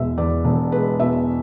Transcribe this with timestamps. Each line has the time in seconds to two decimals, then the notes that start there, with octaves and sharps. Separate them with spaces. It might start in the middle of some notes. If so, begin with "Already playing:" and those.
Already playing: E1 E2 B2 G#3 E5
0.18 E2 D5
0.45 E1
0.72 G#3 B4
1.00 B2 E5